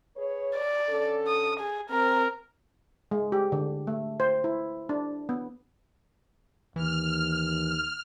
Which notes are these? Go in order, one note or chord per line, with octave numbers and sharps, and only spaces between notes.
G#4 B4 C#5
D5
D3 C#4 A4
D#6
G#4
C4 A#4
G#3
G4
D3
A3
C5
E4
D4
B3
D#2 E3 F6